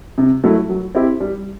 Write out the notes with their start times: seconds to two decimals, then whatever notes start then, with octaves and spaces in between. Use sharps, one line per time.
0.18 C3
0.44 F#3 A3 E4 A4
0.69 F#3
0.95 C4 E4 G4
1.20 G3